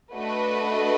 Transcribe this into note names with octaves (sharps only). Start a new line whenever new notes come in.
A3 D4 F#4 B4 D#5